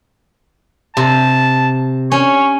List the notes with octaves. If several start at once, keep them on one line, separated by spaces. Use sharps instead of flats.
C3 A5
C#4 C#5